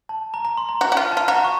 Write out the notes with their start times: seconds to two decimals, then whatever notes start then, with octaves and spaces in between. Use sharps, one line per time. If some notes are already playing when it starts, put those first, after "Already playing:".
0.09 A5
0.34 A#5
0.45 A#5
0.57 C6
0.69 A#5
0.81 F#4 A#5
0.92 F#4
0.97 F4 A#5
1.12 A5
1.17 F4
1.28 F#4 A#5
1.44 C#6